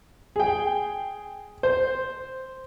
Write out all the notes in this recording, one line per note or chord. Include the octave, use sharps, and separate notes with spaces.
G#4 G5
C5